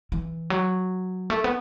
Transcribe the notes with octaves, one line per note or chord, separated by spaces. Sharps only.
E3
F#3
A3
B3